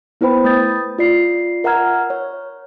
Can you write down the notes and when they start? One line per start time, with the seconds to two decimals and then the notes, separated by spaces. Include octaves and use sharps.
0.21 B3 E4 B4 C5 G5 B5
0.44 A3 D#6 G6 A6
0.99 F4 D5 C7
1.64 A#4 E5 F#5 A#5 F6 G#6
2.10 C#5